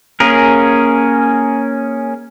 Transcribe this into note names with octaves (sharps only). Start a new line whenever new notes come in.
A#3 C#4 G#4 A#4